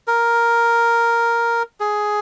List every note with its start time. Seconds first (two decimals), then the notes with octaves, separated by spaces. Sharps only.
0.07 A#4
1.80 G#4